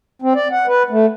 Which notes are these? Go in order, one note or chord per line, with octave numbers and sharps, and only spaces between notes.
C4
D5
F#5
B4
A3